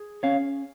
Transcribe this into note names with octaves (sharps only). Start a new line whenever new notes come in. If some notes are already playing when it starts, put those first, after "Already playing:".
Already playing: G#4
C#4 C#5 F5